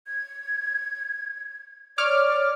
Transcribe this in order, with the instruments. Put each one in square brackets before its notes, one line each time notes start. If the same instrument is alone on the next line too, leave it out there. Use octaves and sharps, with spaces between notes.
[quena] G#6
[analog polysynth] C#5 D6 F6 [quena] D5